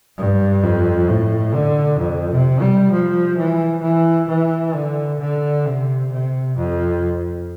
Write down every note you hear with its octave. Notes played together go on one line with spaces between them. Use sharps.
G2
F2
A2
D3
F2
C3
G3
F3
E3
E3
E3
D3
D3
C3
C3
F2